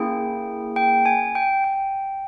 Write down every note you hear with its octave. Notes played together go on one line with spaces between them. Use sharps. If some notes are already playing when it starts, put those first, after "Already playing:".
Already playing: A#3 C#4 E4 G#4 G5
G5
G#5
G5
G5